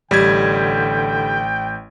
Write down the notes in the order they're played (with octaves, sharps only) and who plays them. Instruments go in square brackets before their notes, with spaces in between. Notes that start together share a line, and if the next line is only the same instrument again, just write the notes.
[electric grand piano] A1 G#6 [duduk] D3 [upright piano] G3 [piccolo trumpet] G5